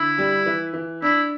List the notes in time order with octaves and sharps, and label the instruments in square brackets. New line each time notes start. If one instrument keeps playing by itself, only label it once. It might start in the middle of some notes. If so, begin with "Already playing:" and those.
Already playing: [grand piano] D3 [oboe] E4
[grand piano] G3
E3
E3
[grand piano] D4 [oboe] E4